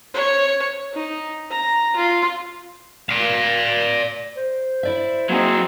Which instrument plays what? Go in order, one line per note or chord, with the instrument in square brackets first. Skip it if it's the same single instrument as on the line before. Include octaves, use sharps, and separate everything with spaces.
[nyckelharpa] C#5
D#4
A#5
F4
[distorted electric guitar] D5 F5
[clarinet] C5
[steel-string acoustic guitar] E4 D5 E5
[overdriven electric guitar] F#3 G#4 [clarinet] A#3 [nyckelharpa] C4 D#4